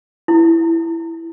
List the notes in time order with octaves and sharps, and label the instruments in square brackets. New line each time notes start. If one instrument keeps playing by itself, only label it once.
[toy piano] E4